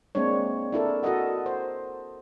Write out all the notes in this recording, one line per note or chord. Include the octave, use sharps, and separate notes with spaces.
G#3 A#3 C4 D4 C#5
D4 E4 A4 A#4
F#4 A4 A#4 D#5 F#5
C5